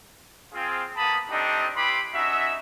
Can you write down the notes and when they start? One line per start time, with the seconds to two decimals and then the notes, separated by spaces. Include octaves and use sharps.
0.54 C4 F4 G#4
0.97 A#3 B3 A5 B5 D#6
1.31 A3 C4 D4 D#4 G4 D#5
1.77 E4 G4 B4 B5 C6 D6
2.15 C#4 D#4 F#4 E5